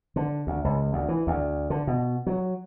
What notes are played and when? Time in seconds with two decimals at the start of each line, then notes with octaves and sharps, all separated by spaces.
0.16 D3
0.47 D2
0.64 C#2
0.93 D2
1.09 E3
1.27 D2
1.70 D3
1.87 B2
2.27 F#3